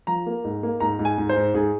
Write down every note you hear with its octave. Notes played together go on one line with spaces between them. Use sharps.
F3 A#5
A#3
G#2
A#3
G#2 A#5
G#2
G#5
G#2
C5
G#2
G#2 G#4